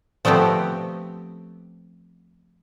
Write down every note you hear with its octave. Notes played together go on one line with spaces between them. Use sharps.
F3 A3 B3 C4 G4